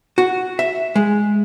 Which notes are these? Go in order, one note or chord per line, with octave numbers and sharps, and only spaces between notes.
F#4
E5
G#3